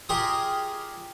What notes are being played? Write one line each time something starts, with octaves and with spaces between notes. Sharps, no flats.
F4 G4 G#4 A#4 D#5 A#5